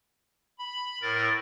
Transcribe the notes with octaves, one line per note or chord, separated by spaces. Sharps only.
B5
A2 A#4 A6